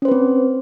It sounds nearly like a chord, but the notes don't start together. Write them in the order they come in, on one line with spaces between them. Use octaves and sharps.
C#4 C5 B4 C4